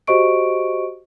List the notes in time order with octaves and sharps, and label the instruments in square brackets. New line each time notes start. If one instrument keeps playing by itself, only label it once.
[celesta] F#4 G4 C5 D#5 C#6 D7